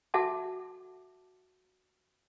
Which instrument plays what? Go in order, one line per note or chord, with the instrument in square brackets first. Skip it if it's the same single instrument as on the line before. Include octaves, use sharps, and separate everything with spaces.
[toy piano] F#4 A4 E5 F#5 A5 D6